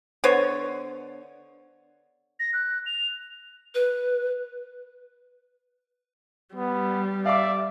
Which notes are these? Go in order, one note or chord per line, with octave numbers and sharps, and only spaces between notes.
D3 B3 C5 C#5
A#6
F#6
F7
B4
G3 B3
D5 E5 F5 D6